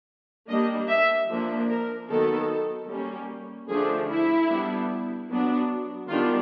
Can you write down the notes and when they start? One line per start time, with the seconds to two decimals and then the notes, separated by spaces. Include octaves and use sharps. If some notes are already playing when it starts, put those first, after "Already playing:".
0.48 G3 A#3 D4 D#5
0.89 E5
1.28 F3 A#3 D4
1.69 A#4
2.09 D#3 F#3 B3 A4
2.89 G3 A#3 C#4
3.68 D3 F3 A3 D4 G#4
4.08 E4
4.48 G3 B3 D4
5.29 F#3 B3 D4
6.08 D#3 G3 B3 D4 F4